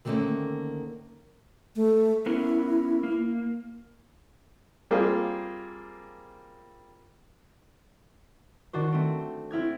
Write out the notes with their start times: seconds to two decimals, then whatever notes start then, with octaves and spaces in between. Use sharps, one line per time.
0.05 D3 D#3 A3 A#3 C4 C#4
1.76 A3
2.26 B3 C#4 E4 A#4
3.03 A#3
4.91 G3 A#3 C4 F4 G#4
8.73 D#3 D4 F#4 C5
8.92 A3 C4
9.51 C4 E4 F6 G#6